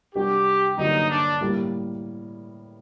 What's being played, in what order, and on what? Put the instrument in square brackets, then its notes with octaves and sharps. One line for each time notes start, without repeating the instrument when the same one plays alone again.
[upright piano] C3 G3 D4 F#4 A#4 [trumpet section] G4
[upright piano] G2 D3 F#3 A#3 F#4 [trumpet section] D#4
[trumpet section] D4
[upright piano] A2 G3 A#3